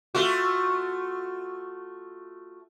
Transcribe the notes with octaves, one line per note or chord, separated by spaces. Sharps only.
A3 F4 F#4